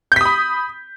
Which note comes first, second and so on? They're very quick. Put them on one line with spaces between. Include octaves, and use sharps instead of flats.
G6 B6 D#6 B5